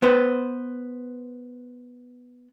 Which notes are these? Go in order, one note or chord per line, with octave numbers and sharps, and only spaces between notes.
B3 B4 C5